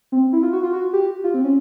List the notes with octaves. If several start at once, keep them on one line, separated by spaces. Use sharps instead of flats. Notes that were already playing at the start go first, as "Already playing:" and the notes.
C4
E4
F4
F#4
F4
F#4
G4
F4
C4
C#4